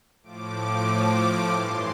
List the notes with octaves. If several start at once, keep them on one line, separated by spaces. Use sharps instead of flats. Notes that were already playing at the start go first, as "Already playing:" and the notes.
A2 F3 D6
D6
G2 E3 C6